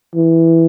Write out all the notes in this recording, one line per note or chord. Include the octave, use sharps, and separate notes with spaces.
E3